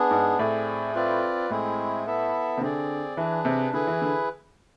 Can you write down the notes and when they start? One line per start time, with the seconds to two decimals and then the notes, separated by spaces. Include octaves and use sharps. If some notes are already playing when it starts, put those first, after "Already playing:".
Already playing: B3 D4 G#4
0.11 G#2
0.38 A2 C4 G#4 D5
0.95 C4 F4 B4 D5
1.50 A2 G#3 C4 E4 G#4
2.06 B3 E4 A4 E5
2.57 C3
2.61 D3 C4 G#4 D5
3.17 E3 D4 G#4 B4
3.45 C3
3.73 D3 E4 G#4 B4
3.87 E3
4.02 D3